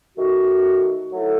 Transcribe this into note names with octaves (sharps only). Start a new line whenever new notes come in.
D#3 A3 D#4 F#4
F#3 A3 E4 A4